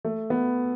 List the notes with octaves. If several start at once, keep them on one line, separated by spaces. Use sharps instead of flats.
A3
B3